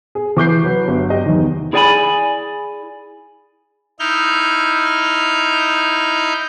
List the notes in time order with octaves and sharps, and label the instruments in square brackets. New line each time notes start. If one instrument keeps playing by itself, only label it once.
[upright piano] G#4
E3 D6 G6 C7
F#3 B4
G1 F#3
G4 D#5
E2 D#3
[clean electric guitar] E4 G#4 D5 G5 G#5 B5
[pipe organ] D#4 E4 F6 G6